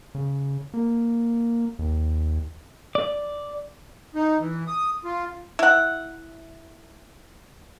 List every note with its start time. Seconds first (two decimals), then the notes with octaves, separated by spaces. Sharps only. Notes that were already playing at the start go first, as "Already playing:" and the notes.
0.15 C#3
0.74 A#3
1.79 D#2
2.95 D5
4.15 D#4
4.40 E3
4.67 D#6
5.05 F4
5.59 E4 F#5